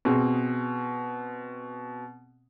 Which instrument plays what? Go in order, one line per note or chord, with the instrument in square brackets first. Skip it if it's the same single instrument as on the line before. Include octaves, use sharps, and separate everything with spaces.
[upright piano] B2 C4 G#4